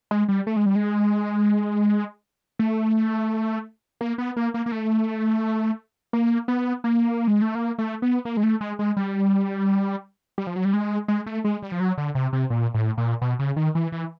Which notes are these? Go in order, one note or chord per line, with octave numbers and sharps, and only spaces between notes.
G#3
G3
A3
G#3
G3
G#3
A3
A#3
B3
A#3
A#3
A#3
A3
A#3
B3
A#3
G#3
A3
A#3
A3
B3
A#3
G#3
A3
G#3
G#3
G3
G3
F3
F#3
G3
G#3
G#3
A3
G#3
G3
F3
F#3
D3
C3
C3
A#2
A2
A#2
B2
C#3
D#3
E3
E3